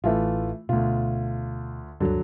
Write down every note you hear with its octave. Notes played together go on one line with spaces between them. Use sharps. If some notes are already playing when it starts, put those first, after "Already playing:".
A1 E3 A3 F4
D2 B2 F4
D2 G2 D3 F#3